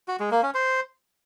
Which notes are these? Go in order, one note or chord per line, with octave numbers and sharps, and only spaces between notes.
F#4
G#3
A#3
C#4
C5